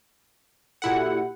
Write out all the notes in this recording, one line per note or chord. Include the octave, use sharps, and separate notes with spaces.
A#2 E4 F#4 G4 A4 F#5